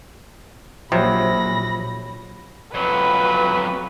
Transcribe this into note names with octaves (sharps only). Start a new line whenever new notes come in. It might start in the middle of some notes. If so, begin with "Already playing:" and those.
A#1 C3 F3 F#3 B5 A#6
F2 F#3 B4